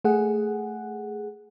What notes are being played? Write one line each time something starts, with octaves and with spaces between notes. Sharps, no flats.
A3 G#4 F#5